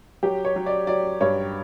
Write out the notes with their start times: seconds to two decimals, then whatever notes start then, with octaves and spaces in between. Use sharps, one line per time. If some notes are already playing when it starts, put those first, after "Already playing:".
0.23 F#3 G4
0.45 C#5
0.56 F#3
0.66 D5
0.87 F#3 D5
1.21 G2 C#5